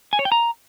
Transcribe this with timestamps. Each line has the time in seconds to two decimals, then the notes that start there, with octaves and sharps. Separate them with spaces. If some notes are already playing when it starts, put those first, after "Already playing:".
0.13 G#5
0.19 C#5
0.25 G5
0.32 A#5